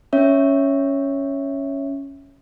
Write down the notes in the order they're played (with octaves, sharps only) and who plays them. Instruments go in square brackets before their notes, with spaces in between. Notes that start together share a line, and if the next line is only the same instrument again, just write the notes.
[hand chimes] C#4 C#5 E5